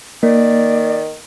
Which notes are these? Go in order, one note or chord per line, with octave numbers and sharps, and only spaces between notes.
D#3 A#3 D5